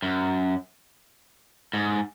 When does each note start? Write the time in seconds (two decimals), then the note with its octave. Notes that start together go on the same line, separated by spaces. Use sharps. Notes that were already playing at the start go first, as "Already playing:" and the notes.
0.02 F#2
1.73 G#2